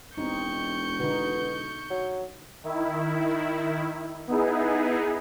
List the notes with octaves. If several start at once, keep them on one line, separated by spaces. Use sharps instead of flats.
E1 C4 D#4 C#6 G6
B2 D3 B3 D#4
F#3
D#3 E4
B3 D#4 E4 G#4